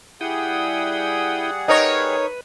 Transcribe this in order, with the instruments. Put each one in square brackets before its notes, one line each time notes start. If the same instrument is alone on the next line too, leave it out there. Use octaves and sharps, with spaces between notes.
[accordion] G3 G#4 F#5 [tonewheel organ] E4 G5 D#6
[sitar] D#4 A#4 C#5 [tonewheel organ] B4 [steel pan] D#5 A#5